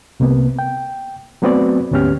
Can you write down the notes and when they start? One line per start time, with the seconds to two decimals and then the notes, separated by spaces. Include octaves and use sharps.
0.20 C2 C3 A#3 B3
0.59 G5
1.42 F#3 A3 B3 C4 F#4 D5
1.91 D2 G#2 B3 C#4 G4 F6